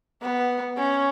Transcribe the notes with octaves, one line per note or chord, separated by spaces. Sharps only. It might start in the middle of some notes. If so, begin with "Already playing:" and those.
B3
C#4